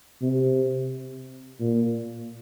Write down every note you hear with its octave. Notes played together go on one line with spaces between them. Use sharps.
C3
A#2